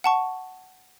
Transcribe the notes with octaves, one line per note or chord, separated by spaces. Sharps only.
F#5 A5 C#6